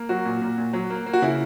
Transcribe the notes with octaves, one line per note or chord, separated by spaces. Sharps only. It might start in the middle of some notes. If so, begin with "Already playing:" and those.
Already playing: A#3
F#3 F#4
A#2
A#2
A#2
F#3
A#3
A#3
F#4
C#3 E4